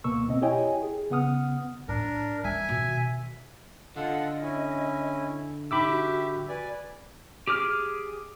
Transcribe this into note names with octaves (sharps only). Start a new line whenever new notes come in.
D2 B2 A#3 C#6 E6
B2 C4 D#5
E4 G4 C#5 D#5 G5 G#5
G#4
C#3 B3 F#5 D#6 F6
A2 D4 A#4
G#3 E5 G#5
B2 D#3
D3 F4 A4 D#5 F#5
C#4 E4 G#5
D#4 G4 E5 B5 D6 E6
F#4
B4 D5 G#5
G4 G#4 D6 F6